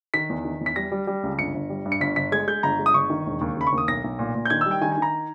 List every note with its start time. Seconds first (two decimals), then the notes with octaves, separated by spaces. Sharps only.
0.14 D#3 B6
0.29 E2
0.45 D#3
0.61 E2
0.66 B6
0.76 G3 A#6
0.92 G3
1.07 G3
1.23 C#2
1.39 G1 C#7
1.54 G1
1.70 G3
1.85 G2
1.92 C#7
2.01 G1 B6
2.16 G1 B6
2.32 G#3 G#6
2.47 G#3 G6
2.63 G1 A#5
2.79 G#3
2.86 D#6
2.94 G1 C#6
3.10 D#3
3.26 E1
3.41 D#2
3.57 C#3 B5
3.67 C#6
3.72 D#2
3.78 D#6
3.88 B1 A#6
4.04 B1
4.19 A#2
4.35 A#2
4.45 G6
4.50 D#3 G#6
4.61 G3 E6
4.71 G5
4.82 D#3 G#5
4.92 G#5
4.97 D#3 A#5